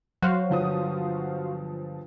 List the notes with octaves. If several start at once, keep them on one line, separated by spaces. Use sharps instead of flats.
F#3 F#4 C5 F5
G1 F3 D#6